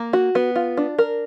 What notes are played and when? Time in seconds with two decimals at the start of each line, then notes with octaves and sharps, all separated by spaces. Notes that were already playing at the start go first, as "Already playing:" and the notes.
Already playing: A#3
0.13 F#4
0.35 B3
0.56 F4
0.77 D4
0.99 A#4